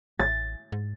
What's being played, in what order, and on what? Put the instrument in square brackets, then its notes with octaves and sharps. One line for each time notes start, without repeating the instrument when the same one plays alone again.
[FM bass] A1 [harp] A6
[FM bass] G#2